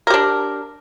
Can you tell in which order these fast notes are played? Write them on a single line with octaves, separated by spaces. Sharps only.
A#4 G4 D4